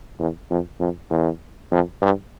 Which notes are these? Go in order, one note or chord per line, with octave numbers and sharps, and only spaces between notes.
E2
F2
F2
E2
F2
G2